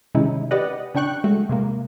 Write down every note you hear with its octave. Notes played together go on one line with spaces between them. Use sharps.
C3 D#3 G#3 C#4 D#4 E4
G4 B4 D5 D#5 F#5
C#3 D4 G5 C#6 F#6
G#3 A3 F#4
C3 G#3 A#3